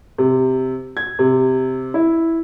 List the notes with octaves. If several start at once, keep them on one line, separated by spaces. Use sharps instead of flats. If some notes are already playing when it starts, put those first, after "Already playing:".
C3
G#6
C3
E4